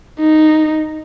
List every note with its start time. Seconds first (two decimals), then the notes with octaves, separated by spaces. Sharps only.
0.20 D#4